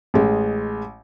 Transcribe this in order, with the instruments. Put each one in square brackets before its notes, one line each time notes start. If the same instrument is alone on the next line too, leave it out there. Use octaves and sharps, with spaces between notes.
[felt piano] A1 G#3